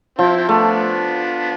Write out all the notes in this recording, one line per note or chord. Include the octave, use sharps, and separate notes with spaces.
F3 C4 E4
C4
A3 B3 D4